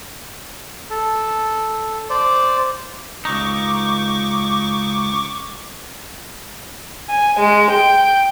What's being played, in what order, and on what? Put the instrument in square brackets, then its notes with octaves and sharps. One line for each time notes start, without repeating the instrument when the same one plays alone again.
[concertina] A4
C5 D5
[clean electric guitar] C#2 D#4 [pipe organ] C#6 D6
[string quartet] G#5
G#3
G5